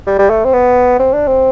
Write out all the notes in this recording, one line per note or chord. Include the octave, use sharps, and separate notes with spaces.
G3
G3
A3
C4
B3
C4
D4
C4